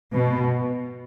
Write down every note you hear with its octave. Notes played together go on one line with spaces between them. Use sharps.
B2